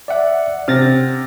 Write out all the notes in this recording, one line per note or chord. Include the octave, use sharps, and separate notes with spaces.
D5 E5 F#5
C3 F6 A6 A#6